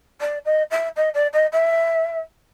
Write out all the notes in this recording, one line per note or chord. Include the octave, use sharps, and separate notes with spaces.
D5
D#5
E5
D#5
D5
D#5
E5